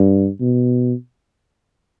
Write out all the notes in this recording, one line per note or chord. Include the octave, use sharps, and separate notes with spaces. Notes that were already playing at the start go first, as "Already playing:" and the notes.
Already playing: G2
B2